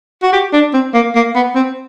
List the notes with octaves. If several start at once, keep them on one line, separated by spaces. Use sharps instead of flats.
F#4
G4
D4
C4
A#3
A#3
B3
C4